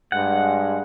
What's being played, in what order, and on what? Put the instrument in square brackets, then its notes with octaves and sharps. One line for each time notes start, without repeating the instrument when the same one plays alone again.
[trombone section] G2 G#3 [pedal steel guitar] F#5